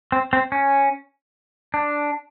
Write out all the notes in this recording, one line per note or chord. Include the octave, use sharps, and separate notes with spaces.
C4
C4
C#4
D4